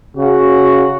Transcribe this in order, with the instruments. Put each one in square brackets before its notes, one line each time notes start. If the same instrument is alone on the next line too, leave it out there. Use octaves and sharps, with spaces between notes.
[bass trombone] C#3 [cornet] F#4